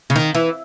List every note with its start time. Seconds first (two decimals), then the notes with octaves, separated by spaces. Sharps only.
0.10 C#3
0.16 D#3
0.35 E3